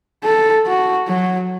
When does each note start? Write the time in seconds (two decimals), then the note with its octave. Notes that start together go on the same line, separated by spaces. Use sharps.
0.24 A4
0.66 F#4
1.08 F#3